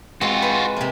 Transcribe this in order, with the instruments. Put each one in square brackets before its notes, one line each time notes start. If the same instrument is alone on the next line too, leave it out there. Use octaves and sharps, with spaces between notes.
[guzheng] G#3 C4 [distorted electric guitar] F4 F#4
[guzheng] B4
C3 A#3